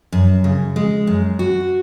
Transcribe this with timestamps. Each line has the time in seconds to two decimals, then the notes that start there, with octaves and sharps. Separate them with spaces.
0.12 F#2
0.44 C#3
0.76 G#3
1.07 F#2
1.39 F#4